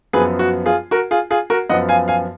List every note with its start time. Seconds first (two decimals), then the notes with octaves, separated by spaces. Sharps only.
0.13 F#2 F3 B3 G#4 B4
0.39 F#4
0.66 F4 G#4
0.91 F#4 A#4
1.11 F4 G#4
1.30 F4 G#4
1.50 F#4 A#4
1.69 F#2 F3 B3 D#5 F#5
1.89 F5 G#5
2.08 F5 G#5